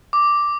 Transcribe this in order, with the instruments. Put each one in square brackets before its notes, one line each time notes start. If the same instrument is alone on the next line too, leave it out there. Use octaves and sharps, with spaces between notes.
[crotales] D6